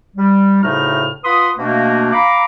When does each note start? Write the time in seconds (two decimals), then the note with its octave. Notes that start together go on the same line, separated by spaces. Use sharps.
0.16 G3
0.63 D2 A2 C#3 A3 D#4 F6
1.24 F4 B4 F#5 B5 C6 D#6
1.58 B2 A3 A#3 D4
2.12 F5 A#5 B5 D6